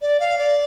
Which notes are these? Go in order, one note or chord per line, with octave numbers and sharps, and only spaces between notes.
D5
F5
D5